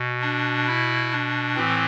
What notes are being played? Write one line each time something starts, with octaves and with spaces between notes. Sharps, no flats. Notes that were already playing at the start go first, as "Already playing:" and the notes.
Already playing: B2
D4
E4
D4
A2 E3 C4